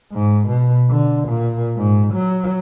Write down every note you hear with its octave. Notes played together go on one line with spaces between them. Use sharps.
G#2
B2
D3
A#2
G#2
F#3